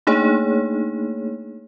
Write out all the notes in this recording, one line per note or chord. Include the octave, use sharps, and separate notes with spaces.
A3 A#3 D4 D#4 G#4 C#5